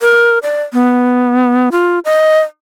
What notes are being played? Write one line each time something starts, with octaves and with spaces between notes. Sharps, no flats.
A#4
D5
B3
F4
D#5